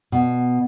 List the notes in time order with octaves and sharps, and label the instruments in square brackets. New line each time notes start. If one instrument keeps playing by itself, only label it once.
[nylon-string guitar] B2